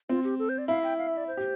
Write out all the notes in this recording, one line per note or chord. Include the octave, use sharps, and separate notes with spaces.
C4 F4
G4
A4
C5
D5
E4 F5
G5
F5
E5
D5
C5
G4